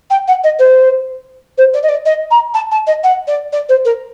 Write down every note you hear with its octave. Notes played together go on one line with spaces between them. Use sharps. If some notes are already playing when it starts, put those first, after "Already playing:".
G5
F#5
D#5
C5
C5
D5
D#5
D5
D#5
A#5
A5
A5
D#5
F#5
D5
D5
C5
A#4